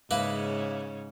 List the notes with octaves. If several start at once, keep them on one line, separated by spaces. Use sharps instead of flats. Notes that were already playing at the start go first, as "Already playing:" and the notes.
G#2 C#3 A#3 C#4 E4 B4